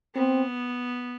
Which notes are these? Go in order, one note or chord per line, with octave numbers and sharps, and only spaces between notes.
B3 C4